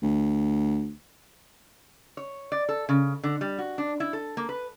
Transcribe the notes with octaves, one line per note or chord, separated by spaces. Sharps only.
D2
C#5
D5
A4
C#3
D3
G3
F#4
D4
E4
A4
A#3
B4